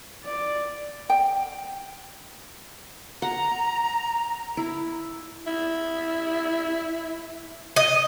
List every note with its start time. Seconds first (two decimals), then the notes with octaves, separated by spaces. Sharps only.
0.24 D5
1.10 G5
3.22 F#5 A#5
4.57 E4
5.47 E4
7.76 D#5